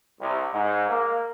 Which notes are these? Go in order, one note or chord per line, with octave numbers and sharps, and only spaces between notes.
C2
G#2
A#3